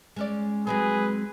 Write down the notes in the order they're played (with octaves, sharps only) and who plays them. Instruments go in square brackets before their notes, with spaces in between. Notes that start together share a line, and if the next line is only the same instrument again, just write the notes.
[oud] G#3 C#4 D5
[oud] F#3 G#3 C4 [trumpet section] G#4 B4